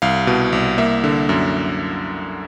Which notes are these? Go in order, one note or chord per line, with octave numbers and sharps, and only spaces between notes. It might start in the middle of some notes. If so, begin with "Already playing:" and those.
C2 F5
B2
C2
A#3 E5
D3
F#2